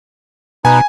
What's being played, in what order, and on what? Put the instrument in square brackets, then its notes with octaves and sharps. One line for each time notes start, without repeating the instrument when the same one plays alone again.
[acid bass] B2 [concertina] D#4 B4 [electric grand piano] G#5